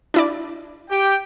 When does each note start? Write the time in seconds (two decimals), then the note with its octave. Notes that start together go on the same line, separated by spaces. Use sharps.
0.14 D4 E4 D5
0.90 G4 G5